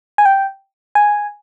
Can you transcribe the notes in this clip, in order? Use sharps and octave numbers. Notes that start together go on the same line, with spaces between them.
G#5
G5
G#5